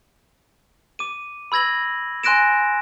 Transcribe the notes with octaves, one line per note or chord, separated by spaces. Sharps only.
D6 D#7
B5 E6 G#6 A#6 F#7
G#5 C6 F#6 A#6 D7 E7